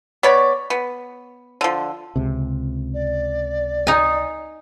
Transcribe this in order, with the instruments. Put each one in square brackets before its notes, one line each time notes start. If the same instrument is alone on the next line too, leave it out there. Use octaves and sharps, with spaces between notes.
[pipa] B3 C#5 D5 B5
B3
D3 F3
[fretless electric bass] C#2 C3
[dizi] D5
[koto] D#4 G#5